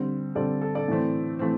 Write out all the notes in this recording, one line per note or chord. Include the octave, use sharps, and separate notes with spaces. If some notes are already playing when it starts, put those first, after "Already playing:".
Already playing: D3 G3 C4
D3 G3 C4 A4 D5
A4
A4 D5
A2 E3 A3 C4
E3 A3 C4